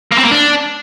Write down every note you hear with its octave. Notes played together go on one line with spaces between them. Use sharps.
A#3
C4
A#3
D4